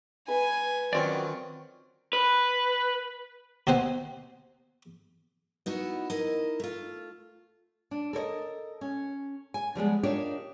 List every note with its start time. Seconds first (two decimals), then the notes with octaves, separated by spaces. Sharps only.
0.28 G#3 B4 G#5 E6
0.93 D#3 F#3 C4 C#4 F4 D5
2.13 B4
3.67 D#2 B2 C4 C5 F#5 G#5
5.66 B3 D#4 E4 F#4
6.10 D#4 E4 A#4 D#5
6.60 A3 F4
7.91 D4
8.13 A4 A#4 C#5 D#5
8.81 C#4
9.54 G#5
9.75 F3 G3 G#3 B3
10.03 D4 D#4 F4 G4 A#4 C#5